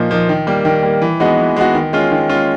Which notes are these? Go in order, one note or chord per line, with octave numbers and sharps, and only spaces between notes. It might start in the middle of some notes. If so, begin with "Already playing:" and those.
Already playing: A#2 F3 A#3 D#4
F3 A#3 D#4
D#3
G3 A#3
D#3
G3 A#3
E3
G#3 B3 D#4 F#4
E3
G#3 B3 D#4 F#4
D#3
G#3 C#4 F4
D#3
G#3 C#4 F4